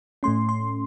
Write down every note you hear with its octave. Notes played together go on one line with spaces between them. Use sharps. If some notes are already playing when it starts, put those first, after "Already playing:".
A2 A3 C#4 C6
C6